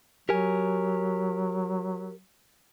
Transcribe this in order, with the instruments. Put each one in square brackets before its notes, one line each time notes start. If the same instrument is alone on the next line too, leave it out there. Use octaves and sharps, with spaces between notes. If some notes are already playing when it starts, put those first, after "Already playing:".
[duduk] F#3 [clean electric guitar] G4 A#4 G#5